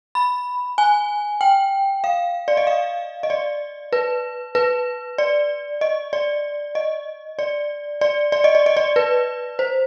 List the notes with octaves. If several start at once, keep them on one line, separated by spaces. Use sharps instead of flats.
B5
G#5
G5
F5
D5
D#5
F5
D#5
D5
B4
B4
D5
D#5
D5
D#5
D5
D5
D5
D#5
D5
D#5
D5
B4
C5